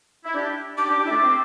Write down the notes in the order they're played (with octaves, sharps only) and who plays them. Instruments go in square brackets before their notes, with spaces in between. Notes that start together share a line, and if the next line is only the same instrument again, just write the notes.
[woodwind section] E4
D4 G4
[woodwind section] D4 G4 [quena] D6
[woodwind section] D4 G4
D4 G4
E4
A3 D4
C4